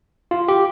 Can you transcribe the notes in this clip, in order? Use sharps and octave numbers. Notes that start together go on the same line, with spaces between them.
F4
G4